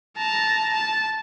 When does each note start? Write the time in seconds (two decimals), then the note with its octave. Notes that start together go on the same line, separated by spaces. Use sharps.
0.17 A5 A#5
0.73 A5